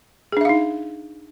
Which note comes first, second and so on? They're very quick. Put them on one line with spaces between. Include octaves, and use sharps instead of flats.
G#4 D4 E5 F5 D#4